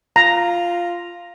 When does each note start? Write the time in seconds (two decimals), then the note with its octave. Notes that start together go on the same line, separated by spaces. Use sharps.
0.16 F4 A#5